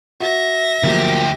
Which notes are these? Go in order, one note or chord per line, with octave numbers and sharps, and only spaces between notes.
F#4 E5 A#6
D2 F3 F#3 A#3 G4